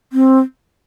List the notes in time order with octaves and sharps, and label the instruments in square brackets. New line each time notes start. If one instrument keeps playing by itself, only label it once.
[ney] C4